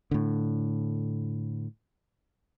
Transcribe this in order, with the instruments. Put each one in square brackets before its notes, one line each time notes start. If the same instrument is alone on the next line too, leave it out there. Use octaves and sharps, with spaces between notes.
[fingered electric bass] A2 D3